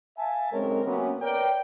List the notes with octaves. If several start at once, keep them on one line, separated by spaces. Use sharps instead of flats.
E5 F5 G#5 A5
B1 C#3 G#3 C4 A#4 C#5
C3 F#3 A#3 B3 C#4
A#4 B4 C#5 D5 G5